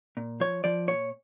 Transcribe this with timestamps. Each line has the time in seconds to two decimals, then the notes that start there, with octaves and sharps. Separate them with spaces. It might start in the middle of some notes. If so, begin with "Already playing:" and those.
0.17 A#2
0.40 F3 C#5
0.64 F3 D5
0.88 A#2 C#5